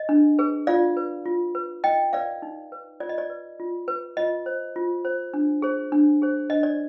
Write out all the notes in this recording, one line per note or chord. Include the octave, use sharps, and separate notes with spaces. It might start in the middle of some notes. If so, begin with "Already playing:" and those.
Already playing: D#5
D4
G#4 B4
F4 D5 F5
B4
F4
B4
D#4 D#5 G5
B4 D5 F5
D#4
B4
F4 D5
D#5
D5
B4
F4
B4
F4 D#5
C5
F4
C5
D4
G#4 C5
D4
G#4 C5
D4 D#5
D5